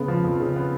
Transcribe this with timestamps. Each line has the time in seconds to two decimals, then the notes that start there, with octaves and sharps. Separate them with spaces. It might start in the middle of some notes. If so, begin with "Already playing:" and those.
Already playing: C#3 B3
0.08 F3
0.24 F2
0.40 C#3
0.56 B3